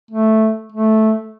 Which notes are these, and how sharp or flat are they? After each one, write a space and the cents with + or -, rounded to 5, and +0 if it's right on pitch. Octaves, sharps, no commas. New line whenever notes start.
A3 -5
A3 -10